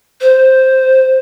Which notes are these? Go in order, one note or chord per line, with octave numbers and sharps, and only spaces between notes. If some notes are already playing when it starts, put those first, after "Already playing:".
C5